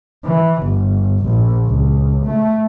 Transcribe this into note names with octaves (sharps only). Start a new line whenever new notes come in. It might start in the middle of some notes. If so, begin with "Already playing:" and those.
E3
G1
A#1
C#2
A3